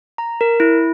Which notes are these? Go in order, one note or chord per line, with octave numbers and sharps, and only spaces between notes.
A#5
A#4
E4